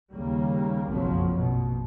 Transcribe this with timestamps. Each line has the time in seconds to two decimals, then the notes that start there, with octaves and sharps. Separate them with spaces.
0.13 D#2 C#3 G3 A#3
0.88 F#1 B1 F2 F3 F#3
1.35 A#1 B2